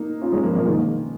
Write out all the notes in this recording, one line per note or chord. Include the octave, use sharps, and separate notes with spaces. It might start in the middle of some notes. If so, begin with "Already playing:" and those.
Already playing: A#3 D#4
C#4 F4
G#3 C#4
F3 A#3
F3 A#3
D#3 G#3